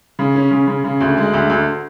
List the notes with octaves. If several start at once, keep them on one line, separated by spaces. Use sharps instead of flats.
C#3
C#4
C#3
C#3
C#3
D2
G#3
D2
D2